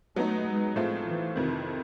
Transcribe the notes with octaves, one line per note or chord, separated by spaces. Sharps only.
F#3 A3 B3 D#4
G#3
A2 F3 G#3 A3 C4 F4
E3
F2 C3 D#3